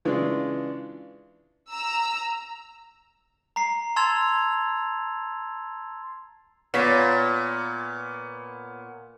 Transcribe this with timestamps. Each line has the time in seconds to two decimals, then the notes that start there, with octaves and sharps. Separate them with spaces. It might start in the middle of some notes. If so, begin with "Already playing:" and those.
0.05 C#3 E3 G#3 D4 F4
1.71 A#5 E6
3.56 A#5 C7
3.96 A5 C6 E6 G#6 A6 F7
6.74 A#2 B3 C#5 B6